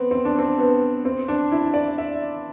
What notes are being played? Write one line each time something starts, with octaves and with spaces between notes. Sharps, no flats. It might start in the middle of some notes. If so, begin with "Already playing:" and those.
Already playing: B3 C4
C4
D4
C4
B3
C4
D4
E4
D5
E5